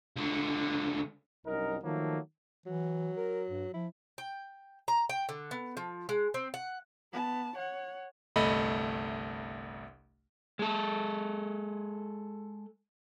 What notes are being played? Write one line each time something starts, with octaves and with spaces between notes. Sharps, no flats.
C#2 D3
C2 F#2 D#4 A#4
D#3 F3 F#3 A3 A#3
E3 F#3
A#4
G2
F3 E4
G5
A#5
G5
D3
B3
F3
G#3
C4
F#5
B3 A5
C#5 F#5
G1 C2 A3 D#5 B5
G#3 A4